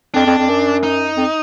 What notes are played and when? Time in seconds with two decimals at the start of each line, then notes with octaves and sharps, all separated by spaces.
0.14 F2 D4
0.26 F2
0.38 F2
0.49 F#2
0.83 D#4
1.17 F2